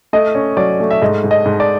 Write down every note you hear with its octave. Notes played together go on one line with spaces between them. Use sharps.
A3 D#5
C#4
F#3 D5
A3
E5
G#2 D#5
G#2
D#5
G#2
D5